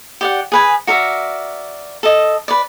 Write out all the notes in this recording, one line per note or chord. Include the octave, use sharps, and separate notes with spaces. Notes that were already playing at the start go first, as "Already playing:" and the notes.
G4 D5 F#5
G#4 B4 G#5
F#4 A#4 D5 E5
A4 D#5
B4 D5